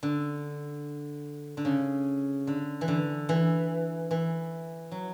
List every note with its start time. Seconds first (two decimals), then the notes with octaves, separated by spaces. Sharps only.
0.03 D3
1.57 D3
1.65 C#3
2.47 D3
2.81 E3
2.88 D3
3.29 E3
4.11 E3
4.91 F#3